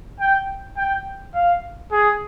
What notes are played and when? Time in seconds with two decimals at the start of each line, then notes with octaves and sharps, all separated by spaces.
0.20 G5
0.77 G5
1.34 F5
1.92 G#4